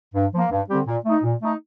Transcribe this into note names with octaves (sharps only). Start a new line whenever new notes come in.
G2
F3 A#3
G2
D3 G3 C4 G4
A#2
A3 D#4
A#2
A3 D#4